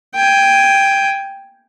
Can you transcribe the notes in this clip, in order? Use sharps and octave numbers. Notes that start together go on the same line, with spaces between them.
G5 G#5